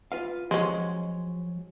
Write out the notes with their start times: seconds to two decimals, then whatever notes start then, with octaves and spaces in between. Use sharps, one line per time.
0.12 F4 B4 F5
0.51 F3 F#3 G#3 C#4